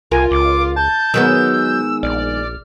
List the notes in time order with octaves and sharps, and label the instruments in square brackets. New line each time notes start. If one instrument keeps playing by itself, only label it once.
[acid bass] C2 [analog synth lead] F4 [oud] A#4 [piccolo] G#5
[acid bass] C#2 [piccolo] D6
[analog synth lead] A5 [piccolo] G6
[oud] D#3 G#3 B3 [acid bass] F#3 [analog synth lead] E6
[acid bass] A#1 [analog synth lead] D5 [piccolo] F6